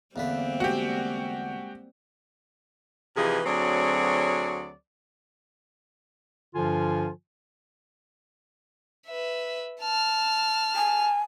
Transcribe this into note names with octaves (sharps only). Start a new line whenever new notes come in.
E2 D3 G3 A#3 C4 B4 F5
G#3 F#4 G4
C3 E3 F3 D#4 G#4 B4
D2 F#3 C4 G#4 C#5 D5
G2 D3 F3 F4 G#5
B4 E5
A5 F6
G#5